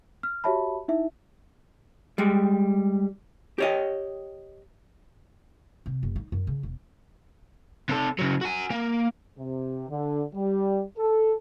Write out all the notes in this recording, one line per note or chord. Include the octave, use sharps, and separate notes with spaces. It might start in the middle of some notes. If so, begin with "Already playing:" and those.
F6
F#4 G4 C#5 E5 A5 B5
D#4 E4 E5
G3 G#3
G4 C#5 D#5
C3
F#1
D#4
F#2
C#3
E1
C3 A4
C#3 F#3
F#4 G#5
A#3
C3
D3
G3
A4